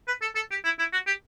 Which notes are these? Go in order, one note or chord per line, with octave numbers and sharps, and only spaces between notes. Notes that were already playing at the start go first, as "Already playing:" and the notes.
B4
A4
A4
G4
E4
E4
F#4
G4